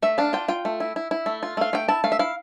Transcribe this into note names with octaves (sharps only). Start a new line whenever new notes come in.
A3 E5
D4 F5
F4 G5
F4 G5
A3
E4
E4
E4
A3
F4
A3 F5
A3 G5
E4 A5
A3 F5
E5
E4 F5